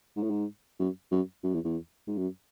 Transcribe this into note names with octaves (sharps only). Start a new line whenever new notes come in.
G#2
A2
G#2
F#2
F#2
F#2
E2
E2
G#2
F#2